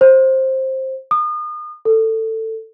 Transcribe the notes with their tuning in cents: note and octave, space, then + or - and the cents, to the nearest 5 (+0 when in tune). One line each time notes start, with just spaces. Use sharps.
C5 +15
D#6 -35
A4 +15